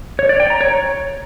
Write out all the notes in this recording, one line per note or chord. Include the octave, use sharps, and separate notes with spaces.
C#5
D5
G5
A#5
C#5